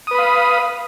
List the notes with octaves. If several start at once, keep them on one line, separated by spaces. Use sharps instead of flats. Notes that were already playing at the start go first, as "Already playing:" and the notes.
B4 F5 B5 D#6